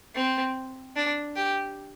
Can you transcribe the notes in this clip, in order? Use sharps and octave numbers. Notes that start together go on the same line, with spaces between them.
C4
D4
G4